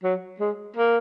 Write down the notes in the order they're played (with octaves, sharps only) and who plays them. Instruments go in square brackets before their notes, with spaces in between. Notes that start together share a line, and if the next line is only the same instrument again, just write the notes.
[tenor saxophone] F#3
G#3
A#3